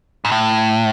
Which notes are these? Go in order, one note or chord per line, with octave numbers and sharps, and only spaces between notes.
G#2
A2